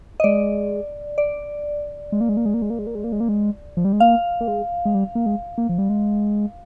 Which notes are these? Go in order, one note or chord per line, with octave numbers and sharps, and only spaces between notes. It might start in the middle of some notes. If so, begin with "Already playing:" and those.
D#5
G#3 D5
D5
G#3
A#3
G#3
A#3
G#3
A#3
G#3
A#3
G#3
A#3
G#3
A#3
G#3
A#3
G#3
F3
G3
G#3
A#3 F5
A#3
G#3
G#3
G3
A#3
G#3
A#3
F3
G3
G#3